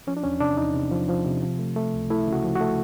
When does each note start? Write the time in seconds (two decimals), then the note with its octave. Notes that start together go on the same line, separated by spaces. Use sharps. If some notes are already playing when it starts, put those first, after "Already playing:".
0.07 F3 C#4
0.17 D4
0.24 E2 C#4
0.40 C3 D4
0.57 E2 D#4
0.74 C3
0.92 F3
1.09 F3
1.26 C3
1.42 F3
1.59 A3
1.76 A3
1.94 C#2
2.10 A3 E4
2.27 C#3
2.33 F#4
2.44 F3
2.56 A3 F#4